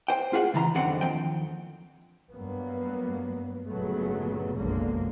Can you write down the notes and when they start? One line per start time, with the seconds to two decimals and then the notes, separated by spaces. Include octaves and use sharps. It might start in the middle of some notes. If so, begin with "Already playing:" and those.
0.08 C5 G5
0.33 F4 G#4 F#5
0.54 C#3 E3 A5 A#5 C6
0.75 B1 F2 D3 D#3 C4 F#5
1.01 D#2 F3 G5
2.32 G2 F#3 A#3 B3
3.67 G1 A#2 C#3 F#3 A3 B3
4.55 F1 B1 F#2 D3 G#3 A#3